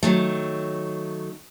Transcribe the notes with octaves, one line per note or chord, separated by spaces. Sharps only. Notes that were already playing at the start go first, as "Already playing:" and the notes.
D#3 F#3 A3